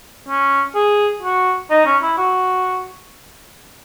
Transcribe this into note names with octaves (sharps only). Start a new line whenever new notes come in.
C#4
G#4
F#4
D#4
C#4
E4
F#4